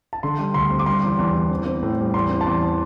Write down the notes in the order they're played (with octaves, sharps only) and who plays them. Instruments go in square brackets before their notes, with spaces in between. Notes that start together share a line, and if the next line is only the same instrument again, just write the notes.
[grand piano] A5
D3 C6
G3
D2 C6
C4
D6
G3 C6
E2
E2
E2
C4
C4
A2
G3
E2 C6
C4
A5
E2 C6